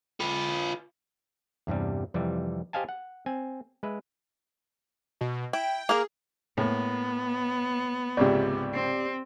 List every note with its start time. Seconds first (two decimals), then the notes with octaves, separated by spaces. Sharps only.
0.20 F4 B4
1.67 E2 G2 C3 G3
2.14 F2 C3 E3 G3
2.73 G4 C5 D#5 F5 G#5 A5
2.89 F#5
3.26 C4 G#5
3.83 G#3 B4 E5
5.21 B2
5.53 E4 G5
5.89 A#3 G#4 A#4
6.58 A2 A#3 B3
8.17 C#2 G#2 C3 G4 D5
8.74 C4